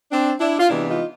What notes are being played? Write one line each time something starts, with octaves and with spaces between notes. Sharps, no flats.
C4 D4
D4 E4
F4
C3 E3 G#3 B3 D4 E4
D#4 F4